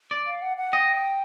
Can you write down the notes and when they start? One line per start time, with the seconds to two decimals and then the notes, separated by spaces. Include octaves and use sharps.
0.11 D5
0.26 F5
0.42 F#5
0.57 F#5
0.73 D#5 G5